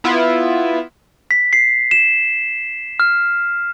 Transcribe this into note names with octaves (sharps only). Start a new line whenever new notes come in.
B3 E4 F4
B6
C7
E7
F6